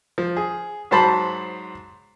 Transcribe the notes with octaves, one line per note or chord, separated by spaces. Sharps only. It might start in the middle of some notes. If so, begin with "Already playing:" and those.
F3
G#4
G#2 F#3 C5 A5 B5